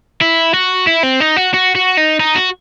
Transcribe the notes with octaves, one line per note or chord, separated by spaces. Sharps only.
E4
F#4
E4
C4
D#4
F#4
F#4
F#4
D#4
D#4
F#4